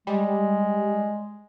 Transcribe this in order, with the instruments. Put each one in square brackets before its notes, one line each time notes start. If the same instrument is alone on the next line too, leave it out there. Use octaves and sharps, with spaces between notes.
[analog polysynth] G3 [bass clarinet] G#3